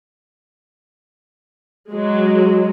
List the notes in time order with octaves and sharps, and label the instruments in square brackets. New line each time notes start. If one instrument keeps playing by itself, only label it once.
[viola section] F#3 G#3